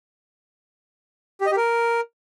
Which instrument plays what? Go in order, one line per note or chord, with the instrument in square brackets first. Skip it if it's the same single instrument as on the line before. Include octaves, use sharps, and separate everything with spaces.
[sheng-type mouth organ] G4
D#5
G4
A#4